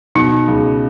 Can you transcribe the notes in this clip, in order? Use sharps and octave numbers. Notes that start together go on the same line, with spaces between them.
B2 D#4
C#2